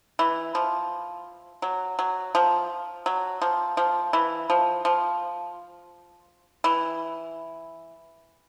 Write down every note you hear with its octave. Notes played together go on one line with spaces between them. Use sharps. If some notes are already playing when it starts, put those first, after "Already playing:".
E3
F3
F#3
F#3
F3
F#3
F3
F3
E3
F3
F3
E3